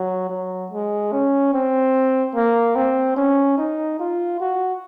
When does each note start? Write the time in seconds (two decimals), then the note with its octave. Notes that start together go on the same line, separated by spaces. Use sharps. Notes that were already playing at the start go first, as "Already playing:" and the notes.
Already playing: F#3
0.29 F#3
0.72 G#3
1.12 C#4
1.53 C4
2.35 A#3
2.75 C4
3.16 C#4
3.57 D#4
3.99 F4
4.40 F#4